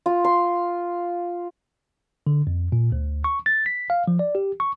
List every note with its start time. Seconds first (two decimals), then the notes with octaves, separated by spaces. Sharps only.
0.06 F4
0.24 C6
2.27 D3
2.47 F2
2.72 A#2
2.92 D2
3.24 C#6
3.46 A6
3.66 B6
3.90 F5
4.08 F3
4.19 D5
4.35 G4
4.60 C#6